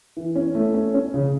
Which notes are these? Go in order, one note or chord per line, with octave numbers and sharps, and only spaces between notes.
E3
C#4
A3
C#4
C#4
C#3